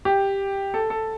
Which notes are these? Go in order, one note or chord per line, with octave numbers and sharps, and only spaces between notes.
G4
A4
A4